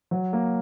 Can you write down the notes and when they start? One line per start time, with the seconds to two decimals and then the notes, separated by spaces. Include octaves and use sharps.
0.11 F#3
0.33 A#3